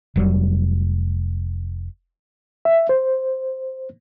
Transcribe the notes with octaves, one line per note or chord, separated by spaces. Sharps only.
F1 F#3 G3
E5
C5